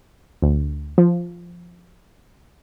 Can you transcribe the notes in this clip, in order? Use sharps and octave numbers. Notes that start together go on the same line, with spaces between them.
D2
F3